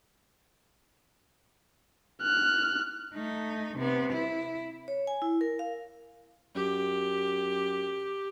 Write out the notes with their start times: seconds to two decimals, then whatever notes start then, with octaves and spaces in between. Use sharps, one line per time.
2.22 F6 F#6
3.15 A3 D#4
3.77 C3 B3
4.13 E4
4.88 C#5
5.07 G#5
5.22 E4
5.41 A#4
5.59 F5
6.55 F#2 G4